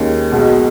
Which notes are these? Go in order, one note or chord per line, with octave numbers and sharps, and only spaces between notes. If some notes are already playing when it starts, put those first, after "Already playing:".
Already playing: D#2 D#3 G#3 C#4
B1 B2 G#3